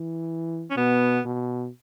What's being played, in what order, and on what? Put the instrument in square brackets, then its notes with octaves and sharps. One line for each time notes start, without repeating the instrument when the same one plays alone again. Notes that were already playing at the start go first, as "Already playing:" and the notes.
Already playing: [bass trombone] E3
[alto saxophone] C#4
[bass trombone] B2 [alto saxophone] B3
[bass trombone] B2